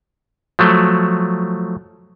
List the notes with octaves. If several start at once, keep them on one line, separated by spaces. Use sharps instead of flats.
F3 F#3 A3